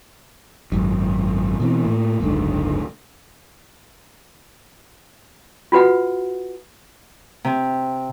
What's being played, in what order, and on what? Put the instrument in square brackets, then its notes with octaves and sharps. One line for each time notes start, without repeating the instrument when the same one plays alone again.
[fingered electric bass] G#1 F#2
B2 E3 C4
A2 A#3
F#1 C#2 G#2 D3
[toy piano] F4 F#4 B4 F#5
[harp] C3